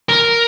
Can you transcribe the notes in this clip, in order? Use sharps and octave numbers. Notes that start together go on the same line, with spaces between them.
A#4